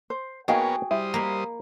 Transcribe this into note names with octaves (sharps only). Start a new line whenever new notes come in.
C5
A#3 B3 D#4 F#4 G#4 A#4 C#5 G5
G3 E4 C5 D#6
A#3 B5